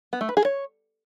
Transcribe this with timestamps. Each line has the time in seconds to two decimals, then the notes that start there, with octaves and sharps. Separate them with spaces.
0.13 B3
0.21 A3
0.29 B4
0.37 G#4
0.45 C#5